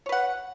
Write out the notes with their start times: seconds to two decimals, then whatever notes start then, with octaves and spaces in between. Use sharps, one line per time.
0.06 C#5
0.09 B4
0.12 F#5